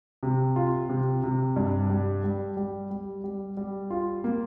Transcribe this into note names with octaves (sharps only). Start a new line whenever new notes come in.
C3
F4
C3
C3
G2
G3
G3
G3
G3
G3
G3
F4
A#3